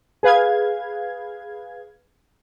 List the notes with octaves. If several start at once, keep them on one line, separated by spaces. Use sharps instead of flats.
G#4 B4 F5 G#6